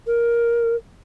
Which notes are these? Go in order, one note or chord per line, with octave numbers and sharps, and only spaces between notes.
A#4